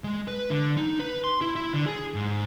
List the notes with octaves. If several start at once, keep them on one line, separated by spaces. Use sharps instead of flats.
G#3
B4
D3
D#4
B4
C6
E4
E4
D3
G#4
G#2